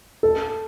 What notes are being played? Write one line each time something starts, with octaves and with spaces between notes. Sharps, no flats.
A4